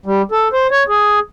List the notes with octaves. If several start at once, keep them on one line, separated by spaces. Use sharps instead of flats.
G3
A4
C5
C#5
G#4